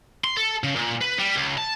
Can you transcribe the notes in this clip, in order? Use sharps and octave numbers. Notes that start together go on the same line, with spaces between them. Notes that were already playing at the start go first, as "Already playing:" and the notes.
C6
A4
C#3
A#2
B4
G3
C#2
A5